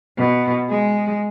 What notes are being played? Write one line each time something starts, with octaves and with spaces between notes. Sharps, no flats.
B2
G#3